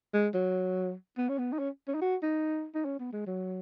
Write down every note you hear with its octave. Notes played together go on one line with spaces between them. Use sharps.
G#3
F#3
B3
C#4
B3
D#4
C#4
C#4
D#4
F#4
D#4
D#4
C#4
B3
G#3
F#3